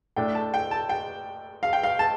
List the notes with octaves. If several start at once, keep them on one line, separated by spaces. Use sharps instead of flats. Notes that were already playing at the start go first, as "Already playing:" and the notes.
A2 A3 D4 G5
A5
G5
A5
G5
F5
G5
F5
A5